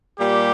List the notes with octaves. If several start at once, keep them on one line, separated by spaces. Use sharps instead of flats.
A#2 G3 G4